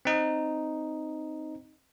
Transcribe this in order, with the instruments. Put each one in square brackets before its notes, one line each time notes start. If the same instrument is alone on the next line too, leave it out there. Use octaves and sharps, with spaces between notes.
[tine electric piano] C4 D#4